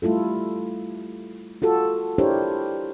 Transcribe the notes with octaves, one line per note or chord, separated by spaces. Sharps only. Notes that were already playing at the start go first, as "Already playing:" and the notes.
G3 A3 E4 F4 A4
F4 F#4 A4
D4 E4 G4 A#4 C5 C#5